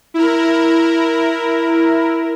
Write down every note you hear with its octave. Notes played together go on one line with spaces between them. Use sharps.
E4 A#4